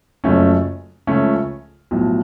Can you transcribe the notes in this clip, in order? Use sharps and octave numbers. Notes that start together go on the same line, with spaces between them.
F#1 F#2 C#3 F3 A3 C#4
C#2 C#3 F3 A3 C#4
B1 A2 F3